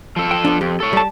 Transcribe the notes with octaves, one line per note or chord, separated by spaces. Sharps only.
F3 A4
G5
B3 D4
F2 G4
A4 C#5
G3 A5